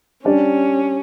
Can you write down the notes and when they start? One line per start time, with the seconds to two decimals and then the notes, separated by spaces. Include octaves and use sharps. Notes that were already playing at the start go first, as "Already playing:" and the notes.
0.25 G3 C#4 D4 G4 D5